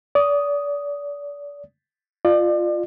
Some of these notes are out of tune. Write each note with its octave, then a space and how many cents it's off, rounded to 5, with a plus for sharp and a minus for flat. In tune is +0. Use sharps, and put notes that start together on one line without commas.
D5 -35 D#6 +0
F4 +0 D5 +35